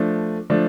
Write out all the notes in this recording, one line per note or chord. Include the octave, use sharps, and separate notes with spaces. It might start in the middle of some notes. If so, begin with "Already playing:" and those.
Already playing: F3 A3 D4
F3 A3 D4